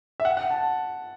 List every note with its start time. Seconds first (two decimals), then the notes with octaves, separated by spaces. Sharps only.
0.20 E5
0.25 F#5
0.37 F#5
0.50 A5